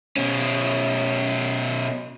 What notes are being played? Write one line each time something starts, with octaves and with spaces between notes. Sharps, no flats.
B2 C#4